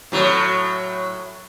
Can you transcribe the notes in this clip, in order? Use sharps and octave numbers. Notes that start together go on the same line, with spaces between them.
A2 F#3